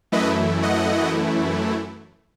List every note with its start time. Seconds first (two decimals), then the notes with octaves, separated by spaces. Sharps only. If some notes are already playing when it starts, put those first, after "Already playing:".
0.12 F#2 E3 A3 E4 B4 D#5
0.63 D#5 F#5